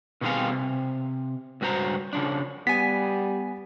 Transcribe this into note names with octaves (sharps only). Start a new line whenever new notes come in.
B2 D#3 G3 C4 G#4 F5
C3
C#2 G2 F#4 C5 A#5
C#3 F3 D4
G3 B3 G#5 B6